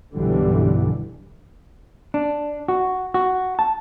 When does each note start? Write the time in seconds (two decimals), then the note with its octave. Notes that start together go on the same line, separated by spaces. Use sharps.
0.14 B1 G2 B2 D3 E3 G3
2.14 D4
2.68 F#4
3.14 F#4
3.59 A5